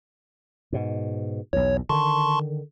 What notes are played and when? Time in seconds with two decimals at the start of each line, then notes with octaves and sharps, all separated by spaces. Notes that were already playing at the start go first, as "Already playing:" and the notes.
0.72 G#2 B2
1.53 B1 E2 C#5
1.89 D3 D#3 A5 C6 C#6